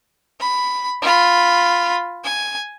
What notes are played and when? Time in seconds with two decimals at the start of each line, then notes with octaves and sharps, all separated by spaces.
0.40 B5
1.02 F4 B5
2.24 G#5